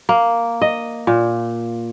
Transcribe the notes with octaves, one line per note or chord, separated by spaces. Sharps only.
A#3
D#5
A#2